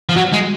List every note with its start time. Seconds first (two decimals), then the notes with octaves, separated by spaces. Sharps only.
0.09 F3
0.16 F#3
0.33 G#3